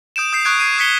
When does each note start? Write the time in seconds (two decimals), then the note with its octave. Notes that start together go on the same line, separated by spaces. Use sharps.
0.16 D#6 G6 D7 E7
0.33 D#6 G6 C7
0.45 C#6 D#6 F#6 G#6 D7
0.59 G#6 C7 D#7
0.78 D#6 G#6 B6 C#7 G7